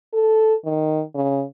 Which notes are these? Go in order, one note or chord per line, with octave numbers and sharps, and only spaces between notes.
A4
D#3
C#3